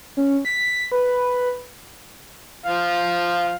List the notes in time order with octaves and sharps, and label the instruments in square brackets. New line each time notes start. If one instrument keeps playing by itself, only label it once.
[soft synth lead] C#4
B6
B4
[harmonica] F3 F5